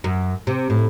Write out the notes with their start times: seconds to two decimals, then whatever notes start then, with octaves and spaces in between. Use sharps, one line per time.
0.04 F#2
0.47 C3
0.70 A2